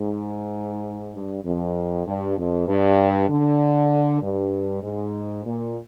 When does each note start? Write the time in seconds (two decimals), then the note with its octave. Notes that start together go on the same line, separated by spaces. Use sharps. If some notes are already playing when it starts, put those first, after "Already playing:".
Already playing: G#2
1.14 G2
1.44 F2
2.06 G2
2.37 F2
2.68 G2
3.29 D3
4.22 G2
4.82 G#2
5.44 A#2